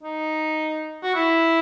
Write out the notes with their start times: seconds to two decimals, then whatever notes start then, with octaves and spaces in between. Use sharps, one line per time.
0.03 D#4
1.03 F#4
1.15 E4